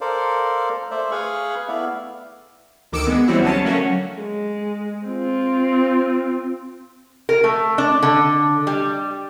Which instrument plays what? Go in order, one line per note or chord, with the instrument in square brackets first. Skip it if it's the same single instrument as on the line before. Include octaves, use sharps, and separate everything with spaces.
[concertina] A4 A#4 C5 D5 F5
A3 C5 D5 E5
G#4 B4 F5 B5 C#6
A3 B3 E4 D5 E5 F5
[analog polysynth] D2 D#3 D6 E6 C#7 D7
G#3 B3
E3 G3 C4 C#4 E4 F#4
D3 F#3 C#4 A5
F#3 A3 A#3 C#4 F#4
[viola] G#3
C4 F4
[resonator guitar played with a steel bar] A#4
A3
D4
D3
G3